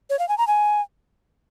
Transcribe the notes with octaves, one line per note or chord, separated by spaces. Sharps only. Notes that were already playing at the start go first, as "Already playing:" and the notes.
C#5
F5
G#5
A#5
G#5